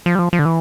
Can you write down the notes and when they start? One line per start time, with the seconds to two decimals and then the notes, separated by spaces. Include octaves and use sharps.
0.06 F3
0.15 G3
0.19 F3
0.33 F3
0.39 D3
0.45 E3